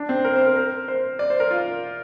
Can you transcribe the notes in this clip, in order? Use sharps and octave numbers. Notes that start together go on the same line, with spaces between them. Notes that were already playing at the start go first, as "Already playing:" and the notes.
Already playing: D4
C4
A#4
C5
A#4
A#4
C5
D5
C5
A#4
F4